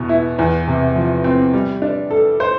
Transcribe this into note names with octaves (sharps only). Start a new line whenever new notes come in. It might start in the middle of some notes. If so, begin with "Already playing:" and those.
Already playing: E2 B2 B3
E4
E2
C3
F3
C4
G3
D4
A4
C5